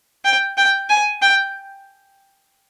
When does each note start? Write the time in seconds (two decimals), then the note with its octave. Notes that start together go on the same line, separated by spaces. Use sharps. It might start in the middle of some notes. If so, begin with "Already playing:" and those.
0.25 G5
0.57 G5
0.90 G#5
1.22 G5